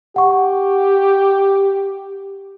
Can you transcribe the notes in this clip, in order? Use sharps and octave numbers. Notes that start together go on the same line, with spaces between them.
G4 F#5 C#6